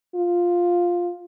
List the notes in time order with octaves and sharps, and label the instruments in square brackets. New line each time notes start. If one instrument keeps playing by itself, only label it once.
[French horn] F4